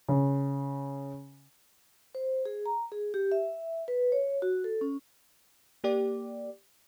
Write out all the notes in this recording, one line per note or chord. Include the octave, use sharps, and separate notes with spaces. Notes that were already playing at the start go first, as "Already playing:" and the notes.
C#3
C5
G#4
A#5
G#4
G4
E5
B4
C#5
F#4
A4
C#4
A#3 G4 D5